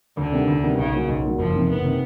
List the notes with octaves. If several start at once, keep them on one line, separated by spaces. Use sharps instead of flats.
D2 D3
C3 D#3 G3 B3
D2
C3 D#3 G3 B3
B1 C#3
A#2 F#3
B1
A#2 F#3
F#1 F3
F2 C3 D#3
F#1 B3
C3 D#3